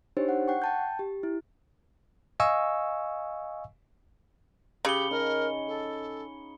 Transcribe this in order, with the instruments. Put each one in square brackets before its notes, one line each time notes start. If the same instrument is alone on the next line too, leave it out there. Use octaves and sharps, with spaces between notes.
[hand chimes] D4 D#4 G4 C5 C#5
F#5
F#5 G5 C#6
G5 A5 G6
G4
E4
[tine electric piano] D#5 F5 G#5 C#6 E6
[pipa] C#3 [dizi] G4 [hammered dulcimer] F5 A5 [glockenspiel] B5 C#7 G7
[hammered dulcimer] C#4 D#4 G#4 [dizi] A#4
[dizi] A4